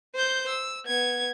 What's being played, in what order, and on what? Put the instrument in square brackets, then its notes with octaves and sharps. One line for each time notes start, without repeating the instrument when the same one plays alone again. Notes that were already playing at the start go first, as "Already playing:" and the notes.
[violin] C5 G6
E6
B3 G#6